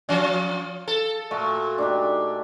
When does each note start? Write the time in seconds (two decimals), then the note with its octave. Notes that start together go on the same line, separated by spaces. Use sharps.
0.09 F3 C#4 F5
0.88 A4
1.31 A#2 A3 F#4 A4
1.78 D4 D#4 G4